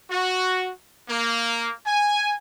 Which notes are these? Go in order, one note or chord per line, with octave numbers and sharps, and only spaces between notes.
F#4
A#3
G#5